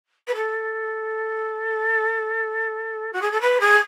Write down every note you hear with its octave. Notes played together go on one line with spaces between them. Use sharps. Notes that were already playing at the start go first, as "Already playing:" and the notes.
B4
A4
F#4
G#4
A4
B4
G#4